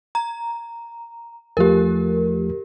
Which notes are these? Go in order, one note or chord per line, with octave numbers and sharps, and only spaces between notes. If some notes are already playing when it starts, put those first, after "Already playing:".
A#5
E2 F3 A3 G4 A#4